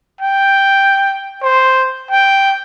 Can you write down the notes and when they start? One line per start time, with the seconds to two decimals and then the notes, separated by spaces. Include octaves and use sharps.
0.21 G5
1.42 C5
2.11 G5